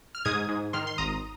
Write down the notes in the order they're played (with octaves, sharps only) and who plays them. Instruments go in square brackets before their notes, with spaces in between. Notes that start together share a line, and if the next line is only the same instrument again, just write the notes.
[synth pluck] F6
G#2 D#6 G#6
G#2
D#3 C6 F6
C6
G#1 A#5 D#6